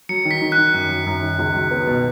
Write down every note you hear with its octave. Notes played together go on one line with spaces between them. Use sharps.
F#3 C#7
D#3
B6
D#3
F#6
D#3
F#2
F#3
F#2
D#3
C#2
F#3
B3
B2